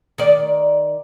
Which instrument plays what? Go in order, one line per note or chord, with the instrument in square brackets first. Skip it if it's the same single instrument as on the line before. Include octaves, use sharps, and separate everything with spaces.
[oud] D#3 D5